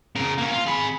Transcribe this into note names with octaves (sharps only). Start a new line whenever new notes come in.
C#3 A#4
A#3 C#4
F4
G#4 B5